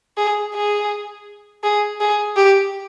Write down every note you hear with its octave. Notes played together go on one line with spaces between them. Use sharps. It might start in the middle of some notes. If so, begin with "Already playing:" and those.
G#4
G#4
G#4
G#4
G4